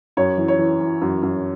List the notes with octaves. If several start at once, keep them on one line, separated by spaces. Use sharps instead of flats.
F#2 C#5
E3
C#5
E3
E3
F#2
F#2